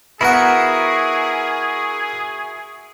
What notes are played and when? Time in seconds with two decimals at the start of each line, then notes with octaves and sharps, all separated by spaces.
0.21 B3 E4 F#4 G#4 A#4 F#5